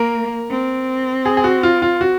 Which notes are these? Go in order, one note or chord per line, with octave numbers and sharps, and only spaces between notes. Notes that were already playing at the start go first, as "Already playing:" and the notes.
Already playing: A#3 A#4
C4
G#4
G#4
F#4
F4
F4
F#4